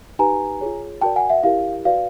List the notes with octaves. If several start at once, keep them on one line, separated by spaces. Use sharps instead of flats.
D#4 G4 B4 G#5 A#5
F4 G#4 C#5
F#4 A#4 D5 G5 A5
F#5 G#5
E5 F#5
E4 G4 A#4 D5 F5
F#4 B4 D5 F5